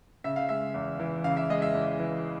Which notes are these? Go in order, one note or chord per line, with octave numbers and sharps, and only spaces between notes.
C#3 E5
F5
G#3 E5
E2
E3
C#3 F5
E5
G#3 D#5
E5
E2
E3